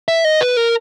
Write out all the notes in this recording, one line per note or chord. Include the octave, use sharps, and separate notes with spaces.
E5
D#5
B4
A#4